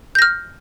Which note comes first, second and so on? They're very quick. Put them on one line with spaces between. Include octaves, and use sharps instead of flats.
G6 A#6 F6